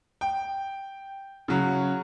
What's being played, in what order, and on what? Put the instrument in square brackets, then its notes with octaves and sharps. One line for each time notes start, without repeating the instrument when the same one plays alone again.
[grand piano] G5
C#3 F#3